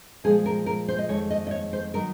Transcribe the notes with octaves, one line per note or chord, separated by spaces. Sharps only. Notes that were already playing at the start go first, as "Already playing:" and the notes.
A#2 F3 G#3 G#4
A#4
A#4
C5
D#5
F2 D#3 G#3 C#5
D#5
D#5
C#5
C5
D#3 F#3 A#4